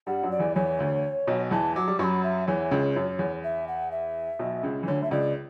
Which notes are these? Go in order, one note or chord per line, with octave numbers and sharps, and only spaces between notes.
G2 G3 F#5
F#2 F#3
D5
E2 E3
E2 E3 C#5
D2 D3
B1 B2
E2 E3 A5
F#3 D6
G3
F#2 F#3 B5 C#6
E5
E2 E3 C#5
C#2 C#3
F#2
E2
E5
F#5
E5
B1 B2
C#2 C#3
E3
D2 D3 C#5
D3 E5
C#2 C#3 D5